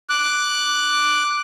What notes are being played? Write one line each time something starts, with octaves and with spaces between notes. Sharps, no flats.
D6 F#6